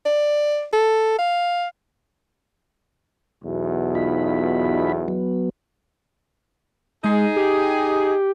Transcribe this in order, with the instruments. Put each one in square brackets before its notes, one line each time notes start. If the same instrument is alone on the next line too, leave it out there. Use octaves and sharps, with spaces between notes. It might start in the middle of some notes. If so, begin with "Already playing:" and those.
[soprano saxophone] D5
A4
F5
[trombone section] B1 E2 B2
[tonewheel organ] D#4 F4 B5
F#3 B3
[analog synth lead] G#3 [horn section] D#4 G#4
[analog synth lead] G4